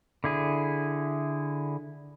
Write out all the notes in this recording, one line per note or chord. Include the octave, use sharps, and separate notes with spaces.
D3 E4 G#4